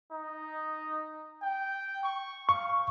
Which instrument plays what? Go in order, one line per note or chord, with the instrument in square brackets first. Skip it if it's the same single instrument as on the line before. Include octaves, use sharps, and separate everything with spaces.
[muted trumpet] D#4
G5
C#6
[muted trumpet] F5 [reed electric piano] C#6